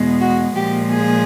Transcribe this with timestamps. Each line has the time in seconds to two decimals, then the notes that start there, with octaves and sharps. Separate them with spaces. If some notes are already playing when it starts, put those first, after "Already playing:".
Already playing: E2 B2 G#3
0.21 F#4
0.56 A#2 F3 G#3 G4
0.91 G#4